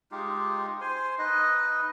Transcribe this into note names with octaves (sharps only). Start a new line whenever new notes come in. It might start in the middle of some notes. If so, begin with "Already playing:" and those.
G#3 D#4 F4 G4
C5 G#5 C6
D#4 B4 D#5